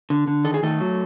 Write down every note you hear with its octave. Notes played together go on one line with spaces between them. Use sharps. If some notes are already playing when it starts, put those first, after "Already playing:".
D3
D3
D#3 A4
G#4
D#3 A3 A4
F#3